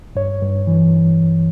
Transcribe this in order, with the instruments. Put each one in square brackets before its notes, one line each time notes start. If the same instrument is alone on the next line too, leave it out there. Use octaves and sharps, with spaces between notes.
[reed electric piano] G2 C#5
G2
E3